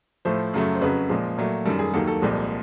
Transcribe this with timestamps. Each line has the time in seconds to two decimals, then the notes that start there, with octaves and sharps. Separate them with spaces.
0.25 A2 F3 A3 C5
0.53 F#2 C#3 F#3 A3
0.75 C5
0.81 F2 C#3 F#3 B4
1.09 A#2 F3 G#3
1.38 A#2 F#3 A3
1.65 F#2 D#3 G3 A4
1.79 G#4
1.93 D#2 D#3 F#3 A#3 A4
2.07 A4
2.22 C2 A#2 F3 G#3